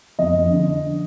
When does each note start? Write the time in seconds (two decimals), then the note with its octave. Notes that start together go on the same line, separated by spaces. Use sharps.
0.19 F2 D#5
0.34 F2
0.51 D3